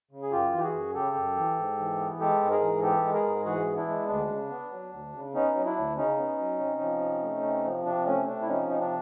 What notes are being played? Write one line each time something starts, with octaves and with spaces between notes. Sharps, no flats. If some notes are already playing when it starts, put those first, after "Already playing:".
C#3
G#4
F#2 F4 G4
E3
G4
F#4 G#4
F#2
C#3 G4 A4
F#2
E3
G#2
E3
B3
G#3 G4 A4
G#2
G#4 A#4
E3
B3 G4 A4
G#3
G#4 A#4
G#2
E3 F#4 G#4
B3
D4 E4
G#3
D2 D4
C#3
B3
F#3
D2
C#3
B3 C#4 D#4
F#3
D4 E4
D2
C#3 C#4 D#4
B3
F#3
C3
F3
C3
A3
C3
F3
C3 D4
A3 C#4
C3 D4
E4
F3 C#4 D#4
C3 D#4
D4